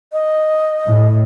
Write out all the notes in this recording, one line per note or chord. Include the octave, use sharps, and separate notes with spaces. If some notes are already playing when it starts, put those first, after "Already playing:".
D#5
A2